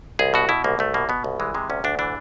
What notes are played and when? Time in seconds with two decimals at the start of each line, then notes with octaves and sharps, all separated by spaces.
0.19 C2 G#4
0.34 B2 F#4
0.49 B2 E4
0.64 C2 A#3
0.79 C2 A3
0.94 B2 A#3
1.09 B2 B3
1.24 C2
1.40 E3 G#3
1.54 C3 G#3
1.70 D2 C#4
1.84 D2 D4
1.99 E3 D4